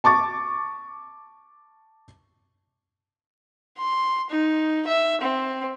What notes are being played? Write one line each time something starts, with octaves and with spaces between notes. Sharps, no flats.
A5 C#6 D6 A6
C6
D#4
E5
C4